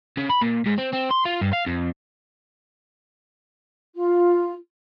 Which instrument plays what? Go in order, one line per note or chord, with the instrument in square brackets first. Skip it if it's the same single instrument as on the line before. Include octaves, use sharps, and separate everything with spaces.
[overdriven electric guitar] C#3
B5
A#2
G#2
C4
C4
C6
F4
G2
F5
F2
[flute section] F4